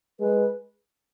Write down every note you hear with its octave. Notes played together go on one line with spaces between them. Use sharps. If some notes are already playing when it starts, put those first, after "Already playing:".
G#3 B4